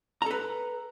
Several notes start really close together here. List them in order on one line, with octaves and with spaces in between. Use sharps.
A#5 A4 B4